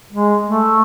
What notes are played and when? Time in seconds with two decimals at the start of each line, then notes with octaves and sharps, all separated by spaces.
0.13 G#3
0.47 A3